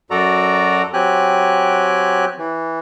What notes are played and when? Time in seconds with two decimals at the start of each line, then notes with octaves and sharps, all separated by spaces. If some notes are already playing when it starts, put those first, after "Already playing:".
0.11 F#2 F#4 A4 D5 A#5
0.93 F#3 C4 G4 G#5 F#6
2.38 E3